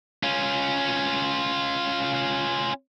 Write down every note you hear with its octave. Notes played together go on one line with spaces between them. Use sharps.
C#4 F4